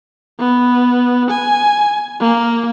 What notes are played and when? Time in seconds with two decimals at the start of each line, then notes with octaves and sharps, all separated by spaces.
0.39 B3
1.31 G#5
2.21 A#3